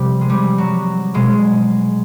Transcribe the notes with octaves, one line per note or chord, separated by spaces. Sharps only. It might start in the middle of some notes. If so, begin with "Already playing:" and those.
Already playing: C3 F3 G3
G#3
G3
F#3
B2 G#3